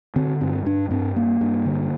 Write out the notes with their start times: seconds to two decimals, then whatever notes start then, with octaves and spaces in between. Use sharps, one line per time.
0.16 D3 C4
0.41 G2 C4
0.66 G2 D4
0.91 G2 C4
1.16 G2 A#3
1.41 G2
1.66 D3